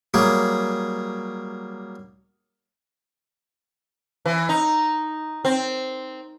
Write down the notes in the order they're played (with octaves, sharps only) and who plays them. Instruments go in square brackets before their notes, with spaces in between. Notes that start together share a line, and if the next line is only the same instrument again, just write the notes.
[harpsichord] F#3 G3 A#3 G#4
[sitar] E3
D#4
C4